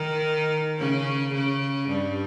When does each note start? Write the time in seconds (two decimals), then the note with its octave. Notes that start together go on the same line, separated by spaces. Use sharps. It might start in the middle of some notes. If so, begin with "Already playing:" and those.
Already playing: D#3 D#4
0.79 C#3 C#4
1.34 C#3 C#4
1.89 G2 G3